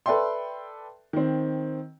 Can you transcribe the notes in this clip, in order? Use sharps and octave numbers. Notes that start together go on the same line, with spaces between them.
A4 B4 D5 E5 G5 C6
D#3 C4